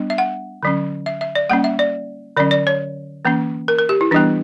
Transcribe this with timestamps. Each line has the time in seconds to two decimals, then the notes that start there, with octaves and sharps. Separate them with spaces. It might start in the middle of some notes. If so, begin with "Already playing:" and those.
Already playing: G3 B3 D4
0.10 E5
0.18 F#5
0.63 D3 F#3 C#4
1.06 E5
1.21 E5
1.35 D5
1.49 G3 A#3 C#4 F#5
1.64 E5
1.79 D5
2.37 D3 F#3 C#4 D5
2.51 D5
2.67 C#5
3.25 E3 A#3 C#4
3.68 A#4
3.78 A#4
3.89 G4
4.01 E4
4.11 E3 G3 B3 D4